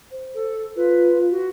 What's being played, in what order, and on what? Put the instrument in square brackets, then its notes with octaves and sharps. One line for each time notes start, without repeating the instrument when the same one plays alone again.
[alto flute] C5
[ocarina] A4
[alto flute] F4 [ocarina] B4
[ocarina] F#4